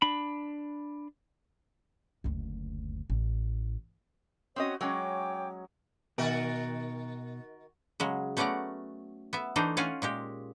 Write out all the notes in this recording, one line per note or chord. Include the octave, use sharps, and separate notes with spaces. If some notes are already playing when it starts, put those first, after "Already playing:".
D4 B5
F#1 D2
A1
C4 C#4 F#4 C#5 D#5 D#6
F#3 G#3 C#4 C#5 G5 D6
B2 D#3 F#4 A#4
C#3 F#3 G#3
A3 B3 C#4 D5 F#5 A#5
B3 E5
E3 A3 D4 D#4 C5
C#4 F4 F5 F#5 G#5
A#2 G#3 G4